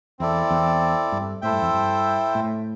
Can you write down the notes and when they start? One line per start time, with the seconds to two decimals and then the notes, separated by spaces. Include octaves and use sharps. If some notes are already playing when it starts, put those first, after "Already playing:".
0.19 E2 C4 E4 A4 D5
0.51 E2
1.12 G2
1.42 A2 E4 A4 C5 E5 G5
1.52 G2
1.62 F2
1.74 G2
2.35 A2